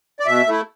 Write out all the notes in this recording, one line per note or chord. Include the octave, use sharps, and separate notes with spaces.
D5
B2 E5
A3 E4